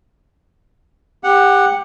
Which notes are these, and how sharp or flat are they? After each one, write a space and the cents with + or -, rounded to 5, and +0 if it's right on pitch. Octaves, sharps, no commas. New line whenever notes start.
G4 +20 F#5 -5